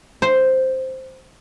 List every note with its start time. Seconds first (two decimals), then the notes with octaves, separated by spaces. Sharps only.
0.22 C5